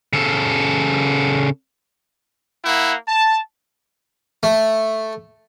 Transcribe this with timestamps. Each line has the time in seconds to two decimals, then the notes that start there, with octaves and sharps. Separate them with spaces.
0.13 C#3 A4
2.65 A#3 E4 F#5
3.08 A5
4.43 A3